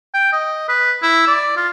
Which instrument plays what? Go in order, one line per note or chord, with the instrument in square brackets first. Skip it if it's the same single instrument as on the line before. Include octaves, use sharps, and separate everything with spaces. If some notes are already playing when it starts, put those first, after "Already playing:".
[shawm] G5
D#5
B4
E4
D5
F4